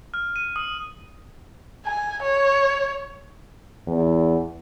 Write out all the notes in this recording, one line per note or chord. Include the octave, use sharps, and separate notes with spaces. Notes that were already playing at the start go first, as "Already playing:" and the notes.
F6
D#7
D#6
G#5
C#5
E2